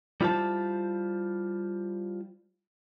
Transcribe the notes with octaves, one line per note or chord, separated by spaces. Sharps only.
G3 E4 F4 C5 A5